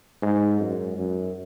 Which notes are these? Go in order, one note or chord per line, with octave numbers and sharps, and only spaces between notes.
G#2
F#2
F#2